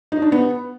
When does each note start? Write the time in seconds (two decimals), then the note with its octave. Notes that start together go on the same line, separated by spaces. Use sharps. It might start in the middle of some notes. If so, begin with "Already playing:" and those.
0.12 D#4
0.22 D4
0.32 B3